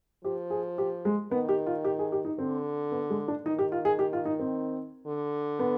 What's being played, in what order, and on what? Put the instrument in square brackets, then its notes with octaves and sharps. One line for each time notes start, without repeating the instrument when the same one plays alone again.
[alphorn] F3 [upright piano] G4
[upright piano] G#4
G4
G#3
[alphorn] D#3 [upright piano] B3
[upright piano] G4
F4
G4
G#4
G4
D#4
[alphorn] D3 [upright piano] C4
[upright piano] B3
G#3
D4
[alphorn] D#3 [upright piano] D#4
[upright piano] G4
F4
G#4
G4
F4
D#4
C4
[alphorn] D3
[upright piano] B3